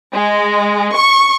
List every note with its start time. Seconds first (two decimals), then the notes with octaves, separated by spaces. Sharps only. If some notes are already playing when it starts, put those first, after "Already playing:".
0.12 G#3
0.93 C#6